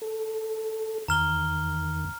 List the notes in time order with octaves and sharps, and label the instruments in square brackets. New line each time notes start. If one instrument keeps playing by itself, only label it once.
[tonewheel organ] A4
[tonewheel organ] E2 D#3 [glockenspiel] A#5 F6 G7